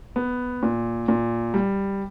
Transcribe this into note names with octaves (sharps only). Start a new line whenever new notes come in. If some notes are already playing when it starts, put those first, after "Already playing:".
B3
A#2
A#2
G3